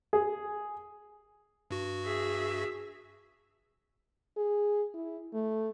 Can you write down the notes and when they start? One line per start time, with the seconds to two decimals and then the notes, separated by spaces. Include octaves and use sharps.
0.13 G#4
1.71 G2 F#4
2.04 G#4 E5
4.37 G#4
4.94 E4
5.34 A3